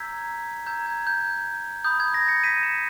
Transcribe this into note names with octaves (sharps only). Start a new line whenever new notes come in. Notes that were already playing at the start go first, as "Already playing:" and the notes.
Already playing: A#5 E6 G6 G#6 B6
A#5 E6 G6 G#6
G#6
G6
B5 D#6 G6
G#6
G6 A#6
A#6 C#7
B6 D#7
C#7 E7